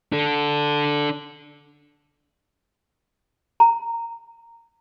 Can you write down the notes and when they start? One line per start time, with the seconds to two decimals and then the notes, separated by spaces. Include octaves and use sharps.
0.12 D4 A4
3.60 A#5